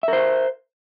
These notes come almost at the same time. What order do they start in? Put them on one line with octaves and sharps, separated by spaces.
E5 A#4 C5